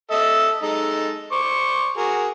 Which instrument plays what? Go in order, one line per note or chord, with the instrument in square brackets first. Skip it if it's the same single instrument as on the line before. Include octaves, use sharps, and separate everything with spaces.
[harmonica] A4 D#5 E5
G#3 D#4 A4
C5 C#6 D6
F#4 G#4 A#4